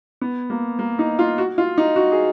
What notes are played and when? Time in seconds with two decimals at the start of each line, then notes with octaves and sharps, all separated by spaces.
0.21 B3
0.50 A#3
0.79 A#3
0.99 D#4
1.19 F4
1.38 F#4
1.58 F4
1.78 D#4
1.96 F#4
2.12 G#4